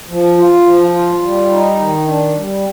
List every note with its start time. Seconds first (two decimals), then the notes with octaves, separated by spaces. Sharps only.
0.10 F3
0.38 F4
0.66 F3
0.94 F4
1.22 G3
1.51 D#4
1.80 D#3
2.08 D4
2.36 G3